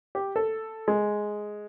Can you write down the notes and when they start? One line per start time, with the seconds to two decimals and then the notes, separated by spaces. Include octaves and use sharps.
0.15 G4
0.36 A4
0.88 G#3